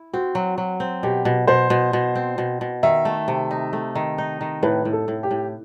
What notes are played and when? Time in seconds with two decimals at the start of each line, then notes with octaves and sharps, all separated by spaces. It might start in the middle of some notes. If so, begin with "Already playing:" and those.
Already playing: E4
0.13 C4 F#4
0.35 F#3
0.58 F#3
0.80 C4
1.03 B2 G4
1.25 B2
1.47 B2 C5
1.70 B2
1.93 B2
2.15 C4
2.38 B2
2.61 B2
2.83 D#3 E5
3.05 A3
3.28 C3
3.51 D#4
3.73 A3
3.95 D#3
4.18 D#4
4.41 D#3
4.63 A2 B4
4.85 A2
4.93 A4
5.08 A2
5.23 G4
5.31 A2